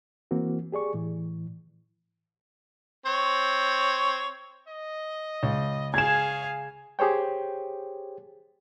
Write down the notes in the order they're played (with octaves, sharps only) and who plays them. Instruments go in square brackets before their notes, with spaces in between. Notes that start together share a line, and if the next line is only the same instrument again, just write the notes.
[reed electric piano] E3 A#3 C4 F#4
G4 G#4 D5 C#6
A2 E3
[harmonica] C4 C#5
[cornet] D#5
[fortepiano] C#2
[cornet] C#4 [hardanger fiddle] G#4 F5 [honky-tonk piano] G#6 E7
[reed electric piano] G4 G#4 C5 C#5 G5